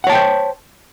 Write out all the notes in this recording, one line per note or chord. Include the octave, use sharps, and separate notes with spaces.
C5 C#5 F#5 G5 A5